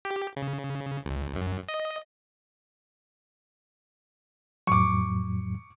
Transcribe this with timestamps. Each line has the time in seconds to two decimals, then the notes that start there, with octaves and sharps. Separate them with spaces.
0.05 G4
0.36 C#3
1.05 C#2
1.35 F#2
1.69 D#5
4.67 F2 A2 F#3 C#6 D6